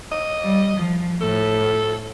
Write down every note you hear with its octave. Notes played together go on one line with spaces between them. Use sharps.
D#5
G3
F3
A2 A4